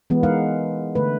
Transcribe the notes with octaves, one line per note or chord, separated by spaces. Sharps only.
E3 G#3 B3
G#3 D#4 A#4 F5 F#5
D3 A3 B4